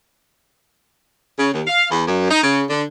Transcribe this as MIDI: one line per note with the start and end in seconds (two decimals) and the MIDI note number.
1.38 1.51 49
1.53 1.62 39
1.67 1.85 77
1.91 2.04 40
2.07 2.27 42
2.30 2.39 63
2.43 2.64 49
2.70 2.83 50